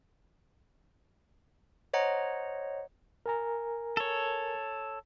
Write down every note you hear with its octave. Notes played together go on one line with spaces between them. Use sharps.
C5 C#5 D#5 F#5 A#5
A#4 G#5 A#5
A4 C#5